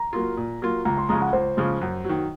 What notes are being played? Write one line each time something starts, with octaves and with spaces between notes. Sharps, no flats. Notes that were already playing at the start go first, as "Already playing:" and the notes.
Already playing: A#5
F#3 A#3 F4
A#2
F#3 A#3 F4
C#2 A#5
C6
C#3 F3 G#3 A#5
F#5
C#2 C5
C#3 F3 G#3
F#2
D#3 F#3